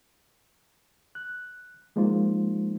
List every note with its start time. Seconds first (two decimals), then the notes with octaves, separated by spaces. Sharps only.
1.15 F#6
1.96 F3 G#3 A#3 D#4 F4 C5